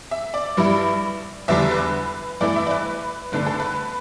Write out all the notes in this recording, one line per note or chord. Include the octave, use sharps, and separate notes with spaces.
E5
D5
G2 G3 E4
E2 D3 G3 D4 E5
B4
G2 E3 A3 E4 D5
E5
D5
B4
G2 D3 A3 D4 B4
A4
B4